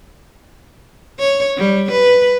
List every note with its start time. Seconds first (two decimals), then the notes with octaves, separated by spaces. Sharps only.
1.20 C#5
1.58 G3
1.92 B4